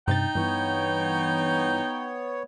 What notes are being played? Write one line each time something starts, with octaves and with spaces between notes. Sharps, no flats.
G2 C3 D#4 G5 A6
G2 E3 B3 C#5